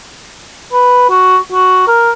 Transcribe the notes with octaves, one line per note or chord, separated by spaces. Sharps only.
B4
F#4
F#4
A#4